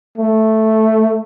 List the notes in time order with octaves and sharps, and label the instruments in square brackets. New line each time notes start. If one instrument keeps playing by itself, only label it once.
[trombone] A3